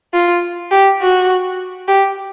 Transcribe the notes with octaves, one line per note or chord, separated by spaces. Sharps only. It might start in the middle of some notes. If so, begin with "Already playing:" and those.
F4
G4
F#4
G4